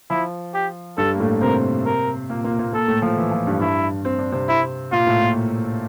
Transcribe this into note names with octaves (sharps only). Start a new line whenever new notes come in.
F3 E4
G4
G2 G3 A4
A#3
A2 A3
C3 C4 A#4
A#4
A#2 A#3
A#2 A#3
A#2 A#3
A#2 A#3 A4
A2 A3
F3
E3
F3
G2 G3
G2 G3 E4
C4
D4
C3 C4
E4
A#2 A#3 F4
A2 A3
A#2 A#3